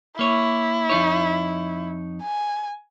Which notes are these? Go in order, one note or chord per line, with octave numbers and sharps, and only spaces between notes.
A#3 E4 C#5
F2 D#4 C#5
G#5